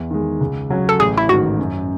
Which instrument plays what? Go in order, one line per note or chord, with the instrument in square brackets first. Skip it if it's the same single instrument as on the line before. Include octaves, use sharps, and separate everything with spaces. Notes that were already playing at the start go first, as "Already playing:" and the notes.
Already playing: [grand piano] E2
D#3 G#3
C#2
C#3 F#3 C#4
[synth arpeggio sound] A4
[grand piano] A1 [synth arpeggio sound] G#4
[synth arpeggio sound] E4
[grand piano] G#2 D#3 [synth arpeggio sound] F#4
[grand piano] F#2